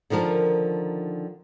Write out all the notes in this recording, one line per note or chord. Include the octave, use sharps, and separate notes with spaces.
D3 D#3 F3 A#4 A5